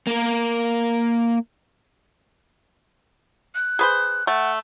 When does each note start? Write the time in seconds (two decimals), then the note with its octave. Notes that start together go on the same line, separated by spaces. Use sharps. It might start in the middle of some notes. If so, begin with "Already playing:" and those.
0.07 A#3 A#4
3.55 F#6
3.79 G#4 B4 C5
4.27 A3 F#5